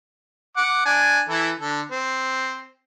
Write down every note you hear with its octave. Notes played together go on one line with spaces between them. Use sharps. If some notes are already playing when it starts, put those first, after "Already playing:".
F#5 D6
D4 G#5
E3 E4 A4
D3 A4
C4